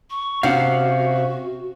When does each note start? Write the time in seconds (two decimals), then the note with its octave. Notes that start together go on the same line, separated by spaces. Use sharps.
0.10 C#6
0.43 C3 C#4 F#4 F5 F#5